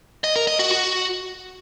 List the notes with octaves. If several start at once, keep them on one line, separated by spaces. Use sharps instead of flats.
D#5
A#4
D#5
F#4
F#4